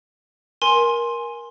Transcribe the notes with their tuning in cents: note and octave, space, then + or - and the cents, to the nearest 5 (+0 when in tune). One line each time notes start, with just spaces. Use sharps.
A#4 +20 G#5 +0 C6 +10